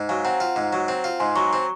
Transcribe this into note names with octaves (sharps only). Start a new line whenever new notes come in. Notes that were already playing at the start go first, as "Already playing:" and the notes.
Already playing: G#2
F#3 F5 G#5
C4 F#5 A#5
F4
G#2
F#3
C4
F4
G#2 G#5 C6
F#3 A#5 C#6
C4